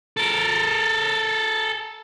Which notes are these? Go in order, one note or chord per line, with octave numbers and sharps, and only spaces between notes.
A4 A#4